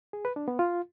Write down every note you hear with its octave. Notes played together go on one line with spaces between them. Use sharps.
G#4
B4
D4
B3
F4